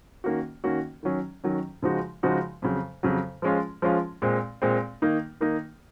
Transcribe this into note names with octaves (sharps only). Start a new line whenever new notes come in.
D#3 A#3 C#4 F#4
D#3 A#3 C#4 F#4
D#3 F#3 C#4
D#3 F#3 C#4
C#3 F3 G#3 D#4 F#4
C#3 F3 G#3 D#4 F#4
F2 C#3 F#3
F2 C#3 F#3
F3 G#3 C#4 F4
F3 G#3 C#4 F4
A#2 G#3 C4
A#2 G#3 C4
D#3 A#3 D#4
D#3 A#3 D#4